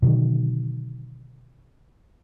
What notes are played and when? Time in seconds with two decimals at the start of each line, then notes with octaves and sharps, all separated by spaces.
0.02 B2 D3 D#3 F#3